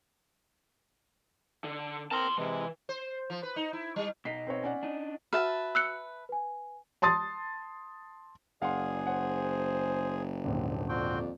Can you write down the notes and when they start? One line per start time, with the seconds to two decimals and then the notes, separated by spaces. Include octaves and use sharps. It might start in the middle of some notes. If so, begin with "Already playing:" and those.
1.64 D3
2.11 C4 A#4 A5 A#5 C6
2.38 C3 E3 G#3
2.89 C5
3.30 F3
3.43 B4
3.56 D#4
3.73 E4
3.96 G3
4.25 B2 D#4 B6 C7
4.47 C4 B4 C#5
4.63 C#4 D5 F#5
4.83 D4 D#4
5.33 F#4 B4 E5 F#5 A5 F6
5.75 E6 F#6 C#7
6.29 B4 G#5
7.02 A5 C6 D#6 A6
8.62 F#1 G#4 D5 F5 F#5 C6
9.07 C5 C#5 F#5
10.44 D#1 G#1 D3 C4
10.89 F2 C4 F#4 D5 G5